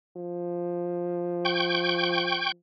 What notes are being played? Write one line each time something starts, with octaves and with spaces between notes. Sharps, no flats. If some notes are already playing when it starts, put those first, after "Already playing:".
F3
G5 C#6 G6